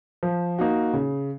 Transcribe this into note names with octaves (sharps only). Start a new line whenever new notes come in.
F3
A#3 D#4 F#4
C#3